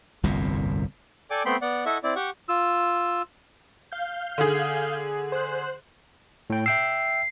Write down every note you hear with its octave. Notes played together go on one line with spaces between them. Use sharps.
G1 C2 F2 A#2
A4 D5 G5 G#5 D6
A3 B3 C4 G5 B5 C6
B3 D5 F#5
E4 A4 D#5 E5 F#5 C#6
C4 E4 D5
G4 F#5 C#6
F4 E6
F5 G6
D3 G#4
C5 F#6
A2 G5
E5 G5 E6 C7